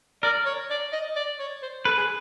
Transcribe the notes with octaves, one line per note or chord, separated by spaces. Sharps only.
A#4 D5
C#5
D5
D#5
D5
C#5
C5
A4 B4
G#4